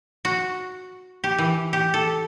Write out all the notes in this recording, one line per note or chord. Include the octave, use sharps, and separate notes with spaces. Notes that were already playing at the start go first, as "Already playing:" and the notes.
F#4
G4
E3
G4
A4